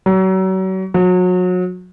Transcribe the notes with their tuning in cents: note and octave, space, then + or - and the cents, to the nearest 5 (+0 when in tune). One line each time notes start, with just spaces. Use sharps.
F#3 +35
F#3 -30